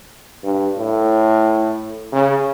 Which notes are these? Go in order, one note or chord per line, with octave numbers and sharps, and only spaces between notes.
G2
A2
C#3